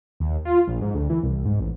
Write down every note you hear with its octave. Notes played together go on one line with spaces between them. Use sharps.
D#2
F4
A#1
G#2
D2
E3
C2
G#2
A1